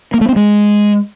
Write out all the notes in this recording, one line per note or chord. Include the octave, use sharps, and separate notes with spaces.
A#3
A3
C4
G#3